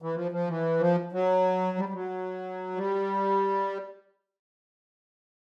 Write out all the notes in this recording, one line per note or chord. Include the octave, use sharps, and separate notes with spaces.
E3
F3
F3
E3
F3
F#3
G3
G3
F#3
G3